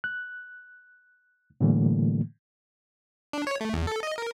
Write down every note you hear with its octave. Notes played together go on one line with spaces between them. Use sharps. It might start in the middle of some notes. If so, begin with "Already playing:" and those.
F#6
A2 D3 E3 G3 A3 A#3
D4
C#5
A3
E2
A4
D#5
A#4